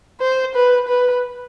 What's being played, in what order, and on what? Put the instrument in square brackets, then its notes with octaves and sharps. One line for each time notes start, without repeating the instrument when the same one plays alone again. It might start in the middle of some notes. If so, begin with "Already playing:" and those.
[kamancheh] C5
B4
B4